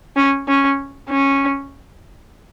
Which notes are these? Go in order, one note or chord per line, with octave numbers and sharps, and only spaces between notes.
C#4
C#4
C#4